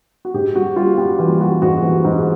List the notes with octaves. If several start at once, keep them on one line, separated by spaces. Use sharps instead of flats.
F#4
G#2 G4
G3 F#4
G3 F4
G3 F#4
E3 F4
G3 F#4
G#2 F#4
E3
G#2